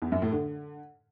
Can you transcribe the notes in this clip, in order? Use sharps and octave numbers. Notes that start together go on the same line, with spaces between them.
E2
F#2
A2
D3